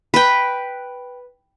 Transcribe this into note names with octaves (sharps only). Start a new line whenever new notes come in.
B4 G5